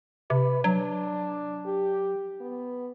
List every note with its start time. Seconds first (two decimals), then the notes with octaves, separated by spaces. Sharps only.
0.30 C3 B4
0.64 F#3 D4
1.66 G4
2.40 B3